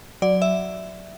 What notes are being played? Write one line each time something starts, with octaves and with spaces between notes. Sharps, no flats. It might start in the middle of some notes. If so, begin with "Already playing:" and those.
F#3 D5
E5